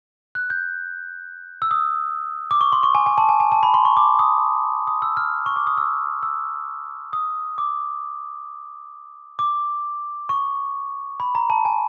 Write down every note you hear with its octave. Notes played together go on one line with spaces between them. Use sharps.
F#6
G6
E6
D#6
D6
C#6
C6
C#6
G#5
G#5
A5
G#5
G#5
A5
B5
C6
C#6
D6
D#6
D#6
E6
F6
C#6
D6
D#6
E6
E6
D#6
D6
D6
C#6
B5
A#5
A5
G#5